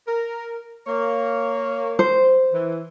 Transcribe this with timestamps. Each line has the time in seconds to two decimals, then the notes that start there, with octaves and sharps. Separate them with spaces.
0.07 A#4
0.87 A#3 C#5
1.99 C5
2.53 E3